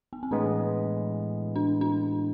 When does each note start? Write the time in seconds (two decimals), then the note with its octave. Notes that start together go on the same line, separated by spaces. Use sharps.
0.13 B3
0.23 C4
0.31 A2 E3 G#3 B3 D4
1.56 D4
1.81 D4